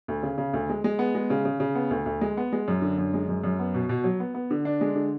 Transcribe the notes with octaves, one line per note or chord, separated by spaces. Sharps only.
D2
C#3
C#3
D2
G#3
G#3
B3
G#3
C#3
C#3
C#3
B3
D2
D2
G#3
B3
G#3
F#2
D3
F#2
G#3
F#2
F#2
B3
B2
B2
F#3
B3
B3
D3
D4
G#3
D3